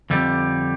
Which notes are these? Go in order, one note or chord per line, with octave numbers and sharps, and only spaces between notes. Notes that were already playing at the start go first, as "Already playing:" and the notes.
F2 D3 G3